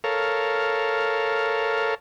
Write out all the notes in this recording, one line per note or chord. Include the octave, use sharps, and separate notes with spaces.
A4 A#4 C#5 F5